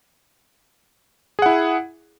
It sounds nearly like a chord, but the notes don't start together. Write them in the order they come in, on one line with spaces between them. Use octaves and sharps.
G#4 F#5 E4